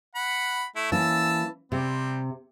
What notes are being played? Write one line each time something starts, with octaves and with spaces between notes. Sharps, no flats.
F#5 B5
A3 E4
E3 A#3 C#4 A5 E6
C3 G3 C4